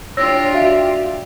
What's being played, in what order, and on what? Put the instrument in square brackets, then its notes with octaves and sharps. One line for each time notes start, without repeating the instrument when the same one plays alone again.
[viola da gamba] D4 F4 G4 [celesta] C#5 E6 A#6
[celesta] F#4 E5 F5